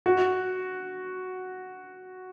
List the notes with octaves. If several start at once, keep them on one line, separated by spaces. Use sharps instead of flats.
F#4